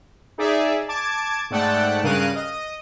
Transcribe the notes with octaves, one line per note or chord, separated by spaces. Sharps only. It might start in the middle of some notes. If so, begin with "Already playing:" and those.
D#4 G#4 D5 E5
A5 D6 G#6
G#2 A3 D5 F#5 G5 A5
G2 C#3 A#4 F5 F#6 D#7
D#5